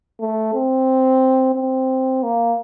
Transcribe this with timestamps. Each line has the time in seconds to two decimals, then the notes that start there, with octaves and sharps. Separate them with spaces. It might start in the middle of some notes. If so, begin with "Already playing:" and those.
0.20 A3
0.54 C4
1.56 C4
2.23 A#3